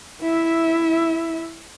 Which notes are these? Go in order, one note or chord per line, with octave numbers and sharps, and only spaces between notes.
E4 E5